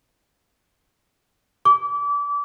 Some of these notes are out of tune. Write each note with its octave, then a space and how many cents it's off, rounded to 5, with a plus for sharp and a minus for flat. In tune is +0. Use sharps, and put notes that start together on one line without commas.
D6 -30